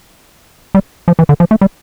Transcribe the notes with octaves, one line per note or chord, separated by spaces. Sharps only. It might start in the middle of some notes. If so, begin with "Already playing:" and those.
G3
F3
E3
D3
F3
A3
G3